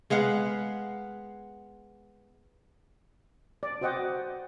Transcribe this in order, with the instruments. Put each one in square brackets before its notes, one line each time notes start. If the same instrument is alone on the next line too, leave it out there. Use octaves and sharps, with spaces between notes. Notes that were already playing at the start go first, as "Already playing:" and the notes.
[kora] G#3 B3 F5 F#5
[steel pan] D5
F#4 C5 D#5 F#5 G5 D6